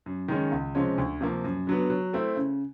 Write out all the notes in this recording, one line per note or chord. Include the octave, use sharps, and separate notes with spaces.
F#2
D#3 G#3 C#4
C#2
C3 F3 G#3 C#4
D2
C3 F3 A#3
F#2
D3 F#3 B3
F#3
A3 C4 E4 A4
C#3